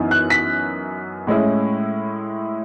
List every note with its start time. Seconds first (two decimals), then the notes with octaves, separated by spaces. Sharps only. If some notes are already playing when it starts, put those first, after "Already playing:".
Already playing: F#2 E3 B3 D#4
0.11 F#6
0.30 B6
1.27 A2 G#3 C#4 E4